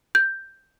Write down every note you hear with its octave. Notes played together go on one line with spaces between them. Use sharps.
G6